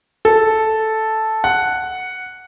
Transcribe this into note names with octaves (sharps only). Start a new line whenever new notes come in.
A4
F#5